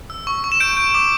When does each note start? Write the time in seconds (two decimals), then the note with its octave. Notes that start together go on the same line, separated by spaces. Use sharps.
0.10 E6
0.27 C#6
0.44 C#6
0.52 E7
0.60 G6 D7
0.77 G6
0.95 D6